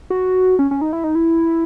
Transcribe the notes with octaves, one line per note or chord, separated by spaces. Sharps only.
F#4
C#4
C#4
D#4
E4
D#4
E4